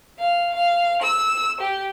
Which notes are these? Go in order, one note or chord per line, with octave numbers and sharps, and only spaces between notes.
F5
F5
E6
G4